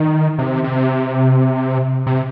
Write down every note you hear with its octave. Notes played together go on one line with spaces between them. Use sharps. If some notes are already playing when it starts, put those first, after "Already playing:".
Already playing: D#3
C3
C3
C3